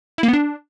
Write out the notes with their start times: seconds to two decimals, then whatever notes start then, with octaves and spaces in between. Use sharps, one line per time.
0.18 E4
0.23 A#3
0.28 B3
0.33 D4